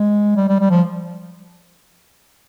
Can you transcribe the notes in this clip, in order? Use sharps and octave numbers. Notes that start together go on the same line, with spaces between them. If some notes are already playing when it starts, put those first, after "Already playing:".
Already playing: G#3
G3
G3
G3
F3